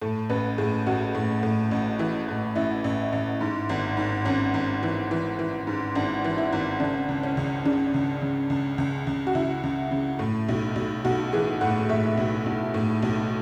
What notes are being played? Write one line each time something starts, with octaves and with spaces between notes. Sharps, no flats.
A2 A4
A1 B4
A2 G#4
A1 F#4
A2
A2
A1
E3
A2
A1 E4
A1
A1
G#2
G#1
G#2
G#1 C#4
G#1
E3
E3
E3
G#2
G#1 D4
E3
E4
G#1
C#3 D4
C#2
C#4
C#2
C#3 D4
C#2
C#3
C#2
C#2
C#2
F#4
C#2 E4
C#2
C#3
A2
B1
B1
B1 F#4
E3 G#4
A2 F#5
A2 E5
B1
B1
A2
B1